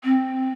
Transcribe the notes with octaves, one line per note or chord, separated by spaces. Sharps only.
C4